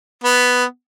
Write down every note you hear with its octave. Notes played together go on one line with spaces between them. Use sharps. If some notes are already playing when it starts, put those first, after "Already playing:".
B3